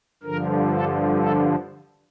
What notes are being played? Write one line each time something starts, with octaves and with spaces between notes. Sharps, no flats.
G2 D3 F3 A#4
A4
A4